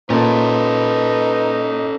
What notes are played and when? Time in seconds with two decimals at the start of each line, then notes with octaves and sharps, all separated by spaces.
0.10 A#2 C#4 D#4 A4 B4